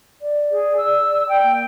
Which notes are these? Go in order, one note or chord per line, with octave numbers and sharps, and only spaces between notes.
D5
G#4
E6
G5
A#3